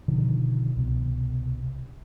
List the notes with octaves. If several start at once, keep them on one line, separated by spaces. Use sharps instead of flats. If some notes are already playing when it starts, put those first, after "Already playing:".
B2 D3 D#3 F3
C2 B2